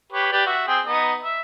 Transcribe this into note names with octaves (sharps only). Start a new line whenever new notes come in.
G4 B4 C#5
G4 B4 D5
F#4 E5
C4 G#4 G5
B3 D#4 D#5
E5